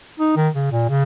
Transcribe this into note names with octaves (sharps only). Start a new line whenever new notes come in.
D#4
D#3
C#3
A#2
C#3